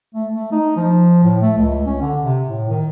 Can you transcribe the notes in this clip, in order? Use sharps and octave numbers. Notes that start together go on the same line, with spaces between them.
A3
A3
D#4
F3
A2
A3
C#2
C#4
D3
C3
A2
D#3